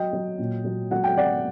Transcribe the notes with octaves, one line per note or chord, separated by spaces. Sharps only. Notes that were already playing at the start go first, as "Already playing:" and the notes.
Already playing: F#3 D#5 G5
F#3
A#2
F#3
F#3 F#5
G5
F#3 D5 F#5